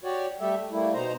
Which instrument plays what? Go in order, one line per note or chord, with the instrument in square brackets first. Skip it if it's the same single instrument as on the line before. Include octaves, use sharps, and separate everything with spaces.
[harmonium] F#4 G4 C#5 D5
G3 A3 G4 A4 E5
A3
G3 A3 A#3 E4
B2 D#4 C5 A#5